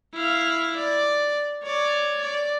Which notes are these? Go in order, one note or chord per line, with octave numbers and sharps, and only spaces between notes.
E4 F5
D5
C#5 D5
D5